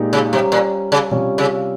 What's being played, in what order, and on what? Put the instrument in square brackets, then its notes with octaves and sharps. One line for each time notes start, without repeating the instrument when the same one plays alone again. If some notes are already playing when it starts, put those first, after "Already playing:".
Already playing: [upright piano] A#2 G#3 D#4 G4
[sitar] C#3
[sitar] C3 [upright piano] G3 C#4 G4
[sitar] A#2
C#3
[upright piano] C3 G3 C#4 F4
[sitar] C#3